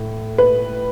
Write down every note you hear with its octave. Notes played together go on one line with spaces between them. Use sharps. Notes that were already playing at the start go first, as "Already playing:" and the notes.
Already playing: A2 A3
B4